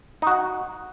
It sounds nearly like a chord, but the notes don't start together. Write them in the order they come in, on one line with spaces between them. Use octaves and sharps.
D#4 F#4 F#5